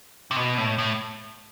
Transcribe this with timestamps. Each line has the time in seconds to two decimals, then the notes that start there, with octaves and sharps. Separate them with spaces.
0.31 C3
0.36 B2
0.58 A2
0.78 A2